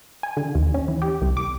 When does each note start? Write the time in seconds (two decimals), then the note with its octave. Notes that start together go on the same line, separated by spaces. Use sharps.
0.23 G#5
0.37 D3
0.55 D#2
0.74 C#4
0.88 E3
1.02 G4
1.22 C2
1.37 D6